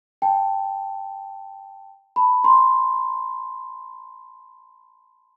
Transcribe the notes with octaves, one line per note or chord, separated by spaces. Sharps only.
G5 A5
A5 B5
A#5 C6